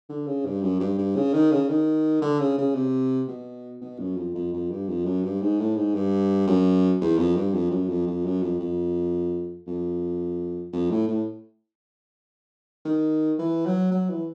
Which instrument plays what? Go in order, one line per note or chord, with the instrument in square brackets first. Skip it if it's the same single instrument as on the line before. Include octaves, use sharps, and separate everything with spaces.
[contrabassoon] D3
C#3
G2
F#2
G2
G2
C#3
D#3
C#3
D#3
D3
C#3
C#3
C3
B2
B2
F#2
F2
F2
F2
G2
F2
F#2
G2
G#2
A2
G#2
G2
F#2
E2
F2
G2
F2
F#2
F2
F2
F#2
F2
F2
F2
F2
A2
A2
D#3
E3
F#3
F#3
E3